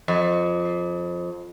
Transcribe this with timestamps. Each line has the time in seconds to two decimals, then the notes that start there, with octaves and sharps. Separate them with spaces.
0.08 F2